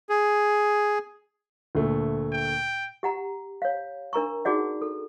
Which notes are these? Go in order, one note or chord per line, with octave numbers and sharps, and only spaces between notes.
G#4
D2 A#2 A3
G5
G4 F#5 A#5
C#5 F5
D4 A#4 A#5 C#6
D#4 F#4 G#4 D5 F#5
A4